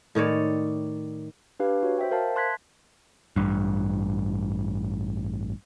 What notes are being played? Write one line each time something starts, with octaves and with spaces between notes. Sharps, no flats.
A2 D#3 C#5 D5
D4 G4 B4 F5
F#4 C#5
C5 E5 G5
A#4 C5 F5 A5
E5 A5 C6 F#6 G#6 B6
A1 G2